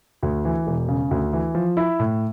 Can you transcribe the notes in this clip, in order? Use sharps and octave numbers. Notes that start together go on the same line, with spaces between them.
D2
E3
E1
C#3
D2
E3
F3
E4
A2